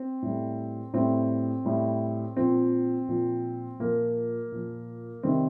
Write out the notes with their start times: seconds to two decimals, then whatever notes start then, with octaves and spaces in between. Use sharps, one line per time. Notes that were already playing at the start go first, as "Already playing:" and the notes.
Already playing: C4
0.22 A2 G3
0.93 A2 G3 C4
1.65 A2 G3
2.36 A#2 F3 C4
3.09 A#2 F3
3.79 A#2 F3 A#3
4.52 A#2 F3
5.23 C3 D#3 G3 C4